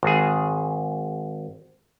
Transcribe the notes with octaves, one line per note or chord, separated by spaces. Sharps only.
G#1 G#4